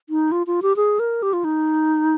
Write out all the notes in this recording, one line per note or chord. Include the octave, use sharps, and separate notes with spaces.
D#4
F4
F4
G4
G#4
A#4
G4
F4
D#4